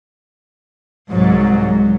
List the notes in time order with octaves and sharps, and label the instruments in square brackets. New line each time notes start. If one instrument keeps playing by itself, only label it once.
[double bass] C2 F#3 [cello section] G#2